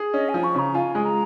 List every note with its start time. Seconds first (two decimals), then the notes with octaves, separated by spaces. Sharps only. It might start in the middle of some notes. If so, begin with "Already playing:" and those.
Already playing: G#4
0.14 C#4 D#5
0.29 G#5
0.34 F3
0.44 C#6
0.55 C#3 A#5
0.75 F4 G#5
0.95 G#3
1.05 A#5